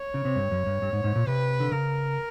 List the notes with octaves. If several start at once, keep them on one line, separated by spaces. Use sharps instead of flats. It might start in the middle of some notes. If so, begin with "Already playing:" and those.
Already playing: C#5
C#3
C3
G2
F#2
G2
G2
G#2
G#2
A#2
C3 B4
D3
C#3 A#4